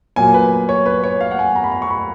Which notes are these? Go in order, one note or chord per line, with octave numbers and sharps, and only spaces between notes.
A#2 F#3 A#3 G#5
B4
C#5
B4
C#5
F5
F#5
G#5
A#5
B5
A#5
C#6
B5